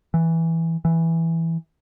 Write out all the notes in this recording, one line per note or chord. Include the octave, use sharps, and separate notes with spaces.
E3
E3